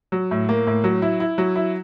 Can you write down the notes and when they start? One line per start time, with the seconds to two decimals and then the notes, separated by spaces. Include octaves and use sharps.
0.12 F#3
0.31 A2
0.49 A#3
0.67 A2
0.84 F#3
1.02 E4
1.20 E4
1.38 F#3
1.56 E4